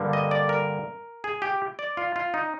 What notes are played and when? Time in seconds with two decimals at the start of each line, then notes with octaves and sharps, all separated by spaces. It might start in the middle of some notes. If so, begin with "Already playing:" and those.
Already playing: G2 D3 G3 A#3
0.13 D#5
0.31 D5
0.49 A#4
1.24 G#4
1.42 G4
1.79 D5
1.97 F4
2.16 F4
2.34 D#4